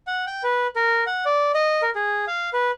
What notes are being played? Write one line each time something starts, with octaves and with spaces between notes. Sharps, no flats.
F#5
G5
B4
A#4
F#5
D5
D#5
A#4
G#4
F5
B4